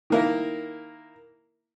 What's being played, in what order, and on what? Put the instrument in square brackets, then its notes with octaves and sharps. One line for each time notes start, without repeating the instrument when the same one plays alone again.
[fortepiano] D#3 A#3 E4